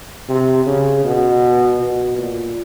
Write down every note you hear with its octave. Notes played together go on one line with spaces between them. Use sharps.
C3
C#3
B2
B2
A#2